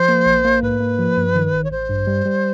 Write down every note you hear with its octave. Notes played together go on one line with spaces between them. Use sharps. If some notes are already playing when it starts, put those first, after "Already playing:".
Already playing: F3 C5
A#3
A#1
A#3
G#2 B4
A#3
F3
G2
D#3
A1
C#5
A1 C5
G2
G3
G3